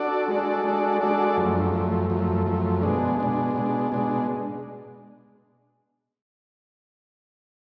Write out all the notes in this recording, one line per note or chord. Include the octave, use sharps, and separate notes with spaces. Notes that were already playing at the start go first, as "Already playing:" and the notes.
Already playing: D4 F#4 A4 D5
G#3 D4 F#4 A4 D5
G#3 D4 F#4 A4 D5
G#3 D4 F#4 A4 D5
F#2 F3 A3
F#2 F3 A3
F#2 F3 A3
F#2 F3 A3
B2 G#3 D4
B2 G#3 D4
B2 G#3 D4
B2 G#3 D4